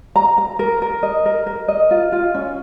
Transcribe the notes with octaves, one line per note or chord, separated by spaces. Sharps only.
A#5
A#5
A#4
A#4
D#5
A#4
A#4
D#5
F4
F4
C#4